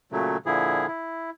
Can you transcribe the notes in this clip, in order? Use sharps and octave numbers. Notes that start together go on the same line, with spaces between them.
A#2 C#3 F#3 A3
A#2 D3 F3 E4 G#4
E4